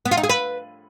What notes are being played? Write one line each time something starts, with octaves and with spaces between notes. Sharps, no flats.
B3
F4
D#4
G#4
B4